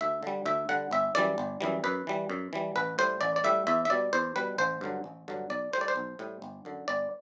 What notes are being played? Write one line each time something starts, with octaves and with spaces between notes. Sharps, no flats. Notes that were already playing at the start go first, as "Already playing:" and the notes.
D2 E5
D3 G3
D2 E5
D3 G3 F#5
G1 E5
F#2 E3 G3 D5
G1
F#2 E3 G3
F#2 B4
E3 G3
F#2
E3 G3
A1 B4
A2 G3 C5
A1 D5
D5
A2 G3 E5
E2 E5
E5
B2 G3 D5
E2 C5
B2 G3 B4
A1 C5
G2 D3 F#3
A1
G2 D3 F#3
B1 D5
A2 G3 C5 D5
C5
B1
A2 G3
G1
F#2 D3
G1 D5